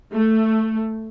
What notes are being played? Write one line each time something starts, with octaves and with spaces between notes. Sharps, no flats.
A3